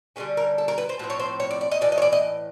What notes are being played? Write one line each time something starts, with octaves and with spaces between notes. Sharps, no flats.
D3 G3 A#3 C#4 G#4
A#4
A4
A#4
B4
C5
A2 F3 A3 C4 B4
C#5
C5
C#5
D5
D5
D#5
A2 E3 D5
D#5
C#5
D5
D#5